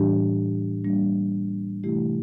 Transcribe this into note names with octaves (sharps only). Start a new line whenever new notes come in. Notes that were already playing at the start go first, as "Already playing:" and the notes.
Already playing: A2 E3 G3 D4 G4
G3 A#3 D4
C3 E3 A3 E4 G4